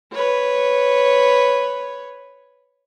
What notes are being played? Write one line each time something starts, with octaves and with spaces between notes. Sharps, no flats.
B4 C#5